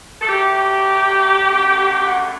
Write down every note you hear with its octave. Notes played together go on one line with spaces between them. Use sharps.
A4
D3 F#3 A3 G4
F#2 D3 A3
F#5